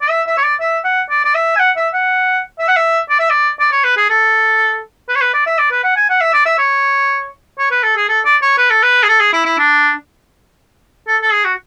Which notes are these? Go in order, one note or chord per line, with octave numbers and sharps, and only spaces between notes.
D5
E5
E5
C#5
D5
E5
F#5
D5
D5
E5
G#5
F#5
E5
F#5
E5
F#5
E5
D5
E5
D5
D5
C#5
B4
G#4
A4
B4
C#5
B4
D5
E5
D5
B4
F#5
G#5
F#5
E5
D5
E5
C#5
C#5
B4
A4
G#4
A4
D5
C#5
B4
A4
B4
G#4
A4
G#4
E4
E4
D4
A4
A4
G#4
F#4